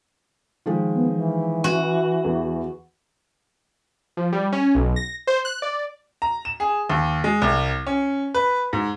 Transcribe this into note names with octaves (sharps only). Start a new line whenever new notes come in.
D#3 F3 G#3
B3
E3
F#4
E2
F3
G3
C#4
B1
A#6
C5
F#6
D5
A#5
E7
G#4
D#2
G#3
C2
C#4
B4
G#2